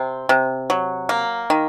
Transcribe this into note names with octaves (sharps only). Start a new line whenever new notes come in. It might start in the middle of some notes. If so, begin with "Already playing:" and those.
Already playing: C3 C4
C3
F#3
A#3
D#3